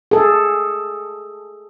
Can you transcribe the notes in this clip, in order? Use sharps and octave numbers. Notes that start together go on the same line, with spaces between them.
G#4 A4